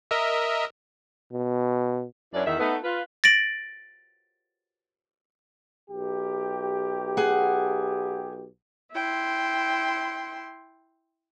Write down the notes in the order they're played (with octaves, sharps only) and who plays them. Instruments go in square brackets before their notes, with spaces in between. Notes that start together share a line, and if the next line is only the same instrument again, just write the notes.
[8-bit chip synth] A#4 D#5 E5
[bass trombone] B2
[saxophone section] F#2 F#3 D4 E4 C#5 D5
E2 D#3 E5
A3 B3 D#4
F4 B4
[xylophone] A6 A#6 D7 F#7
[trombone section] B1 G4
[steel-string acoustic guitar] G#4 F#5
[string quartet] E4 G5 C6